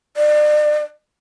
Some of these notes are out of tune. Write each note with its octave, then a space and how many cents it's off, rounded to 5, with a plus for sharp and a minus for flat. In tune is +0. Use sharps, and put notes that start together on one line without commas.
D5 +35